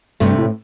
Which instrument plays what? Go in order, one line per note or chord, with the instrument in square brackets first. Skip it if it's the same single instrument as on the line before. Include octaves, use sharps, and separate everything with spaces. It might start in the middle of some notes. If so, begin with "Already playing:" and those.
[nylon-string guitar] D2 C3 A3 [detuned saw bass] G2
[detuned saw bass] A2